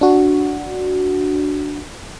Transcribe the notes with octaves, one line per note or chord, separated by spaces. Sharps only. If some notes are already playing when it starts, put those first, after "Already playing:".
D4 F#4